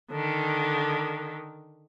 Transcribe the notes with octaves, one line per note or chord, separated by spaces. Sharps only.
D3 D#3